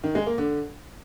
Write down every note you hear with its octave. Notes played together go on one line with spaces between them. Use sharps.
D#3
G#3
A#3
D3